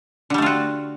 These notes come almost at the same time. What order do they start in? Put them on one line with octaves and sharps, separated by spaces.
D3 G3 A3 F4 F#4